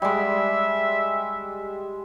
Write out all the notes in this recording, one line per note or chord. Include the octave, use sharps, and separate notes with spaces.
G3 G#3 E5